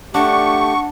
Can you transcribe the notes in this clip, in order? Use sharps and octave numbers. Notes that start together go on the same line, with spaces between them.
A3 D4 G4 F#5 C#6